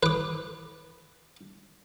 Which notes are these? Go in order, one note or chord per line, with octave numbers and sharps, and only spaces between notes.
B4 D6